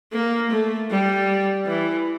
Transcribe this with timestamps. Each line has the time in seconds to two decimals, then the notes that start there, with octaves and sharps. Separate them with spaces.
0.12 A#3
0.50 A3
0.90 G3
1.66 E3